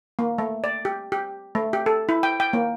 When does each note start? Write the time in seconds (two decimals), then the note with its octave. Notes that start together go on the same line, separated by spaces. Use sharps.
0.19 A#3
0.38 A3
0.64 D5
0.85 G4
1.12 G4
1.55 A3
1.73 G4
1.86 A4
2.09 E4
2.23 G5
2.40 G5
2.53 A#3